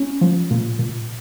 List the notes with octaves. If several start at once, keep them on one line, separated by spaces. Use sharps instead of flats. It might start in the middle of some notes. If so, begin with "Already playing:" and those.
Already playing: C#4
F3
A#2
A#2